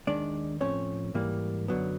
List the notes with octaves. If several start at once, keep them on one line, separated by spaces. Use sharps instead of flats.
D#2 D#3 G#3 D4 D5
A2 F3 A3 C4 C#4 C#5
G#2 E3 G3 A#3
F#2 D3 F#3 B3